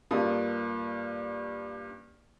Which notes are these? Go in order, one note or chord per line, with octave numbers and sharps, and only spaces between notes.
G2 A#3 F4 D#6